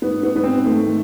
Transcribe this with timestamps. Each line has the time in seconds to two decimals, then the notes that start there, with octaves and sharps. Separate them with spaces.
0.02 G#2 B3
0.23 B3
0.30 G#2
0.36 B3
0.44 C4
0.58 G#2
0.65 A3
0.85 D#3